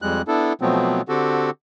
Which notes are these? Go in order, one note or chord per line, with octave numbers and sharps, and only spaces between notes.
F2 G3 G#3 F#6
B3 D4 E4 A4
B2 F3 F#3 A3 B3 C4
D3 C4 F#4 G4 A4